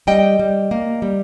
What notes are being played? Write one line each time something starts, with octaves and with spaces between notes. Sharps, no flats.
G3 D#5 G5
G3
A#3
G3